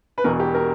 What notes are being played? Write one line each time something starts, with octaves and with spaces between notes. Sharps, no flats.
B4
E1 E2 B2 A#4
G4
A#4